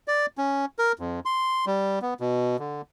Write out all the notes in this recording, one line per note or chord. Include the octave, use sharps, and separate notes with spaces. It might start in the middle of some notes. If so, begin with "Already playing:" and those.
D5
C#4
A#4
F2
C6
G3
B3
B2
D3